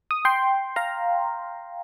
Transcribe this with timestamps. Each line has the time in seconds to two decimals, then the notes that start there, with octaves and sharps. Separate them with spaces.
0.11 D#6
0.25 G5 C6
0.76 F5 A#5